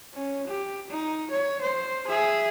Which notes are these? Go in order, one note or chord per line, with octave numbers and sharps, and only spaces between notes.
C#4
G4
D#4
C#5
C5
G#4 E5